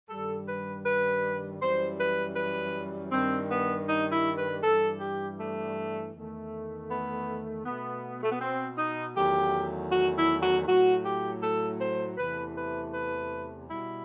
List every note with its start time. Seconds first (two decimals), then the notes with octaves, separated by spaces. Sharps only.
0.10 G2 D#3 G3 A4
0.48 B4
0.86 B4
1.61 F#2 E3 G3 C5
1.99 B4
2.36 B4
3.12 G2 D#3 G3 C4
3.50 B3
3.88 D#4
4.12 E4
4.38 B4
4.63 G2 E3 G3 A4
5.00 G4
5.39 A3
6.14 E2 D#3 A3
6.89 B3
7.65 B2 A3 B3
8.23 A3
8.32 B3
8.41 C4
8.78 D#4
9.16 E2 D#3 F#3 A3 G4
9.91 F#4
10.17 E4
10.41 F#4
10.67 A2 F#3 A3 F#4
11.05 G4
11.43 A4
11.80 C5
12.18 E2 C3 E3 A3 B4
12.56 B4
12.94 B4
13.69 B2 G3 E4